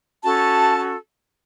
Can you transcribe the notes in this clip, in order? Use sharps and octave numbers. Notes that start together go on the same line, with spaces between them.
C#4 F#4 A4 A5